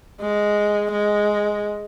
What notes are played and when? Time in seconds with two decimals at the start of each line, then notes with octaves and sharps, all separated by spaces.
0.21 G#3
0.92 G#3